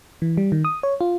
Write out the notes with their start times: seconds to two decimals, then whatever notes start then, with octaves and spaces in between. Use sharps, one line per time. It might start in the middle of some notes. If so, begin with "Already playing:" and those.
0.22 E3
0.37 G3
0.52 D#3
0.65 D#6
0.83 C#5
1.01 F4